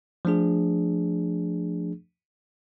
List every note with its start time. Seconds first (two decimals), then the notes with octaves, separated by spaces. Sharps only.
0.25 F3 A3 D4 G#4